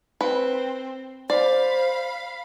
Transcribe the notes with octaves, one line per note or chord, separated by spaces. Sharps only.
C4 B4
C5 D5 F5 B5